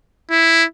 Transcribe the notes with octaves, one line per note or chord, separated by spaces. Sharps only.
E4